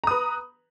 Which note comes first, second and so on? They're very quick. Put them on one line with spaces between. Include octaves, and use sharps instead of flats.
A#5 D#6 B4